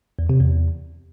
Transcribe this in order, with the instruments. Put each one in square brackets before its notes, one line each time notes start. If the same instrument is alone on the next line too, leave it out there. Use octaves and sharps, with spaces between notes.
[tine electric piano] E2
C3
E2